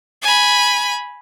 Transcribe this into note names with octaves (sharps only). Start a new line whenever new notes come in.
G#5 B5